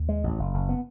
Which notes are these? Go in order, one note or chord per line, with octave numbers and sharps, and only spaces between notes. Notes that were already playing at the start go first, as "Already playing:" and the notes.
Already playing: D#2
G#3
A1
F#1
F#1
B3